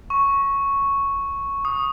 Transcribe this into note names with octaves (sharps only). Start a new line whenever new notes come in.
C#6
D#6